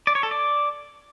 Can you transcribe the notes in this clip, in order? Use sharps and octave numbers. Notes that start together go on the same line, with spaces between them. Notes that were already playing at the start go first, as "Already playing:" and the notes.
D5
C#5
A4
D5